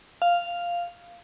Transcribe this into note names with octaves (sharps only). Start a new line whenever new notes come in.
F5